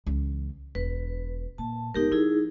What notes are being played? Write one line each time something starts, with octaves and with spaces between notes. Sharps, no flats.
C#2 E3
E1 B4
A#2 A5
G#1 B3 D#4 G4 A#4
F3 D#4 E4 G#4